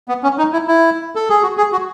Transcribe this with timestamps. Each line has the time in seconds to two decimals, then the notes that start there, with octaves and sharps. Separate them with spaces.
0.09 B3
0.23 C#4
0.38 D#4
0.53 E4
0.68 E4
1.16 A4
1.29 G#4
1.43 F#4
1.57 G#4
1.72 F#4